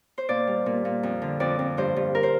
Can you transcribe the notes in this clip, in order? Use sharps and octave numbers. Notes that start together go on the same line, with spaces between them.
C5
A#2 D5
G3
A#2
A#2
F2
D3
F2 D5
F2
G2 C5
G2
A#4
C5